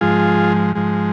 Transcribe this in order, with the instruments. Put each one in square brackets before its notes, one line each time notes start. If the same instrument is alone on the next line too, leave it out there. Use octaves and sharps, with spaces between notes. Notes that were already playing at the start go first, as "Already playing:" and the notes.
[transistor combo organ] G#2 F3 G#3 F4 G#4
G#2 F3 G#3